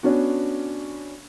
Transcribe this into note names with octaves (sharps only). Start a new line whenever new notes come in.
B3 C#4 D4 F#4